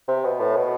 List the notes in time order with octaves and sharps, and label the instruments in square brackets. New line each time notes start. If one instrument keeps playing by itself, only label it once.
[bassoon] C3
B2
A2
B2